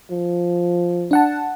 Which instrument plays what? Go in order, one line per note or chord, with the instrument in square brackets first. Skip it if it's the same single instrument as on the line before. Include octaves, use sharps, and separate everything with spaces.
[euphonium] F3
[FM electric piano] D4 F#5 A5